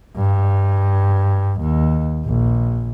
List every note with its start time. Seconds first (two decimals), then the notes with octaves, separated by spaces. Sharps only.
0.17 G2
1.61 D#2
2.26 A#1